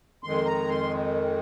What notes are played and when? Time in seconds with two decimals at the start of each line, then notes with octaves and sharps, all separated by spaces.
0.23 F2 D#3 G#3 C6
0.46 A#5
0.69 C6